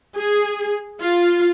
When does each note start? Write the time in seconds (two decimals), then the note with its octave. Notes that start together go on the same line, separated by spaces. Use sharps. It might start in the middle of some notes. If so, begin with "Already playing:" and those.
0.17 G#4
1.00 F4